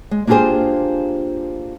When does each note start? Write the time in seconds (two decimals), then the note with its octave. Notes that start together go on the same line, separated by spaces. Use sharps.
0.11 G#3
0.27 A#3 D4 F4 G4 G#4 C5